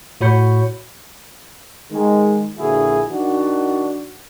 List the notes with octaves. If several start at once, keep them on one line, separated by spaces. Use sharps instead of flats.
A2 F#4 C#5 B5 G6 C#7
D#3 G#3
A#1 D3 E4 F#4 G#4
D#3 D4 F#4